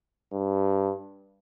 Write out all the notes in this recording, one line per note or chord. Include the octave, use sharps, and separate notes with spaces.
G2